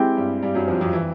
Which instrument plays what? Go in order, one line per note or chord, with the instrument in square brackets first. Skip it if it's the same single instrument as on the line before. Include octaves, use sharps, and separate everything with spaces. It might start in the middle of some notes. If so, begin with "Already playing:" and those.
Already playing: [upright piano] G#3 C4 E4 G4
[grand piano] G2 G3
G2 G3
F#2 F#3
F2 F3
F2 F3
E3